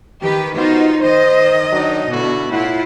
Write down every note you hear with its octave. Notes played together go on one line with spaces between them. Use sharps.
D#3 G4 B4
B3 D#4 F4 F#4 C5
D#3 C5 D#5
F#3 D4 D#4
B2 D3 E4 F#4
A2 E4 F4 F#5